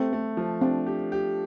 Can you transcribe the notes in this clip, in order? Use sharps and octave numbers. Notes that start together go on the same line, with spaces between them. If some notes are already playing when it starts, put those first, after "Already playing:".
Already playing: A3 C4
A3
F3
C4 D4
G4
G4